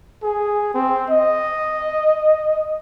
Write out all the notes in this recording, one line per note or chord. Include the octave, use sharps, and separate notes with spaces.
G#4
C4
D#5